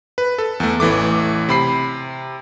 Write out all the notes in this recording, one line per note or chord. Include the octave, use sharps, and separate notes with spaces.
B4
A4
E2 A3
A1 E3 A3 D6
C3 B5 C7